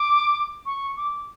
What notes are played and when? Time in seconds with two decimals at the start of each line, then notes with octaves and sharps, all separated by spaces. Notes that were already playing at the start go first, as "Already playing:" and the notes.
Already playing: D6
0.66 C#6
0.97 D6